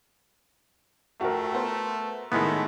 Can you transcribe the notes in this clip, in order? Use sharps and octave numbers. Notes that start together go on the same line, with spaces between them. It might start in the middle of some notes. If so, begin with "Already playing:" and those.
F2 A3 F#4 A#4
B3 C5
A2 D#3 G#3 A3 B3